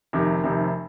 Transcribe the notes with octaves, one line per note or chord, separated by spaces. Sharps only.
F1 F2 C3 D#3
F1 F2 C3 D#3